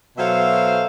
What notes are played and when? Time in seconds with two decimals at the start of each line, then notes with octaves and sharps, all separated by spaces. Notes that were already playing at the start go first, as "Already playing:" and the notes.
0.18 B2 F#3 A4 C5 E5 F5